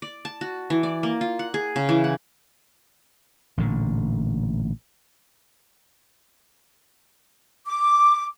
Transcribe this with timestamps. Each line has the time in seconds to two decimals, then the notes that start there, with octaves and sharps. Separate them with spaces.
0.02 D5
0.25 A5
0.41 F#4
0.70 E3
0.83 D5
1.03 A#3
1.21 F4
1.39 F#5
1.54 G#4
1.76 C#3
1.89 E3
2.04 F#5
3.58 A1 A#2 D3
7.67 D6